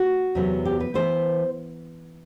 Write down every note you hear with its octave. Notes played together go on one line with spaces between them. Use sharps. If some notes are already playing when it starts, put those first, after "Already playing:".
Already playing: F#4
E2 C3 F#3 B3
G4
B4
E3 B3 C5